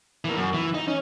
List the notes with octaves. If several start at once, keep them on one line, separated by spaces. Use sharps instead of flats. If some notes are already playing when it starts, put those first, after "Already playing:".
E3 A#3
F#2
E3
D#4
C#4